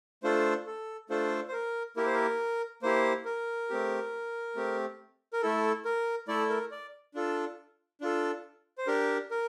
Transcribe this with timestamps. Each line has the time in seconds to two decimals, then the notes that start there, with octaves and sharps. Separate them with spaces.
0.23 A3 D4 F4 A4 C5
0.67 A4
1.09 A3 D4 F4 A4 C5
1.48 C5
1.53 A#4
1.97 A#3 E4 G4 A#4
2.06 C5
2.14 A#4
2.82 A#3 E4 G4 C5
3.25 A#4
3.70 A3 C4 G4
4.56 A3 C4 G4
5.33 A#4
5.42 A3 E4 A4
5.85 A#4
6.28 A3 E4 A4 D5
6.50 A#4
6.71 D5
7.14 D4 F4 A4
8.01 D4 F4 A4
8.78 C5
8.87 D4 G4 A#4
9.31 A#4